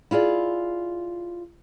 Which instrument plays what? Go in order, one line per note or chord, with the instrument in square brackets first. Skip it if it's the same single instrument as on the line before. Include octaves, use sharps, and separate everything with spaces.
[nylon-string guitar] E4 F4 G#4 D5